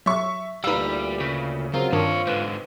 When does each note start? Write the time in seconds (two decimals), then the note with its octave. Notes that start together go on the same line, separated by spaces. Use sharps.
0.06 F#3 E5 C#6
0.64 D2 A#2 G3 D#4 B4 F5 E6
1.20 C#3
1.74 C#3 F#3 C4 F4 A#4
1.93 G2 D#3 A#3 D4 F4 C#5
2.27 G#2 D3 B4